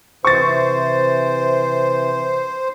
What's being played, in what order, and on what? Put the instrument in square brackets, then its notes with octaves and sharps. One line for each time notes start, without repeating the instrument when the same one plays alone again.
[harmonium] C3 E3 [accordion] C5 [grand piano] C#6 A6